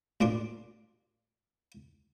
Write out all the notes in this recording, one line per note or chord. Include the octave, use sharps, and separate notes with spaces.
A1 A#2 D4 C6